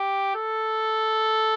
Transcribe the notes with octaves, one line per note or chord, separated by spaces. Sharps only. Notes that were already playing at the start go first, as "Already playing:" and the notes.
Already playing: G4
A4